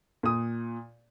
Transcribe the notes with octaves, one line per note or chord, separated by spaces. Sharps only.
A#2 D#6